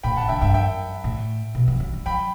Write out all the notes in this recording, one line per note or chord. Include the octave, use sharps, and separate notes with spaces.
A2 G5 B5
C#3 F#5 A5
D3 E5 G5
G2 E5 G5
F#2 E5 G5
A2
B2
F#3
F#3
G3
F#3 G5 B5